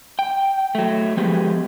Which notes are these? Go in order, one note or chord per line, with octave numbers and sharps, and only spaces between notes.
G5
F#3 A3
F3 G#3 B3 G4